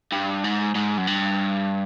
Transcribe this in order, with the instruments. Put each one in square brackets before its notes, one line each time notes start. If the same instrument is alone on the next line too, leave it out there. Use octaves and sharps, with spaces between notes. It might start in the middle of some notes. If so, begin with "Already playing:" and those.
[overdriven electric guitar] G2
G#2
G#2
F#2
G2